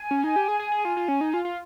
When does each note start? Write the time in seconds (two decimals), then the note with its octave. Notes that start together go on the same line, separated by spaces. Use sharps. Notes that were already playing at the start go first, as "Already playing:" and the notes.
Already playing: G#5
0.11 C#4
0.24 D#4
0.36 G4
0.48 G#4
0.59 G#4
0.72 G#4
0.85 F4
0.97 F4
1.08 C#4
1.21 D#4
1.34 F4
1.45 F4